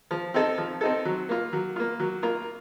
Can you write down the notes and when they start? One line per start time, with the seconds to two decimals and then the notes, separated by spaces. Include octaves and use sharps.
0.11 F3
0.34 C4 D#4 A4
0.58 F3
0.81 C4 D#4 A4
1.05 F#3
1.29 A#3 F4
1.53 F#3
1.76 A#3 F4
2.00 F#3
2.23 A#3 F4 A#4